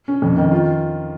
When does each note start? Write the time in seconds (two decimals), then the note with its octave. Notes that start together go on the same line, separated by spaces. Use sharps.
0.08 C#4
0.22 F2
0.37 D#3
0.52 F4